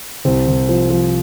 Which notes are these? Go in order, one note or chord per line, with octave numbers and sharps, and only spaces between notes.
C2 C4
C2
F3
F3